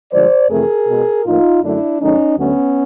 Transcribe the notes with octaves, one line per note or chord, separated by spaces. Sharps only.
G2 D3 F3 G#3 C5 D5
F2 C3 E3 A3 G#4 A#4
B2 G#3
A2 F3 A#3 D#4 F4
F#2 D3 F#3 A3 D4 E4
G#2 D#3 F#3 A3 C#4 D#4
D2 D3 F#3 A3 B3 C#4